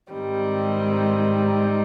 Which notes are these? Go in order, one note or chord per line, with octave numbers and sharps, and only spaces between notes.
G#2 D#3 G3 C4 D#4